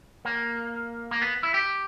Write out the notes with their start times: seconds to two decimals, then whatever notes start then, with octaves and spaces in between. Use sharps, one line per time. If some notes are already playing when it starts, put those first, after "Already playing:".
0.25 A#3
1.11 A#3
1.22 B3
1.43 E4
1.54 G4